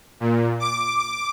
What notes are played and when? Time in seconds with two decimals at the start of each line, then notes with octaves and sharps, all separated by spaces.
0.20 A#2
0.60 D6